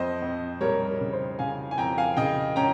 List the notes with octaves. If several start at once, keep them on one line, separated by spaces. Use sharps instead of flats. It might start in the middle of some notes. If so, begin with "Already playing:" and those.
Already playing: F2 C5 D#5
F2
G3 A#4 C#5
A#4
C#3
C5
C#3 F5 G#5
G#5
F2 G5 A#5
F5 G#5
C#3 D#5 G5
C#4 G5 A#5